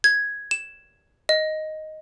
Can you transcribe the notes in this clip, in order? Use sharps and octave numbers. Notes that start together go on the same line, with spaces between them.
G#6
E7
D#5